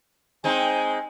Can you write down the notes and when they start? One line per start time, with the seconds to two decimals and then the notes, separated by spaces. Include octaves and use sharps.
0.44 G#3 C4 D#4 G#5